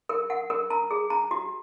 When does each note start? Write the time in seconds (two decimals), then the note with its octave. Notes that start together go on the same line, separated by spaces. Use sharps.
0.09 A#4
0.30 F#5
0.50 A#4
0.70 A#5
0.91 G#4
1.10 A#5
1.31 F#4